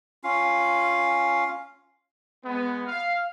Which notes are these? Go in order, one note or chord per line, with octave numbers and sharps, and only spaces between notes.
C#4 F4 F5
G#3 B3
F5